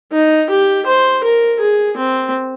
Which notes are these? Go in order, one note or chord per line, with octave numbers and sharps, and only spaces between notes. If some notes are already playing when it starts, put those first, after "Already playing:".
D#4
G4
C5
A#4
G#4
C4